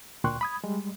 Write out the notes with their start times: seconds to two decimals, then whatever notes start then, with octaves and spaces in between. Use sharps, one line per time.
0.24 D2 A#2 G5 C6 C#6 F#6
0.41 B5 D#6 G#6
0.64 G3 G#3